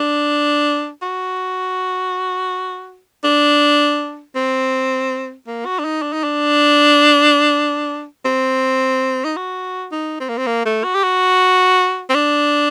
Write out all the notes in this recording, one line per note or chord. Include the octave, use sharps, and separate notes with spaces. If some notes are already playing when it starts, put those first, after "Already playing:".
Already playing: D4
F#4
D4
C4
A#3
F#4
D4
D#4
D4
D#4
D4
C4
D#4
F#4
D#4
C4
A#3
C4
A#3
A3
F#4
G4
F#4
C4
D4